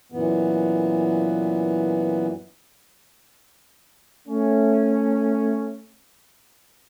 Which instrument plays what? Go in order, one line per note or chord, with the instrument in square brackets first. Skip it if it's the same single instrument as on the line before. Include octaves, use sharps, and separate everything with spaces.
[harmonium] F#2 A#2 E3 B3
[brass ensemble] A3 C#4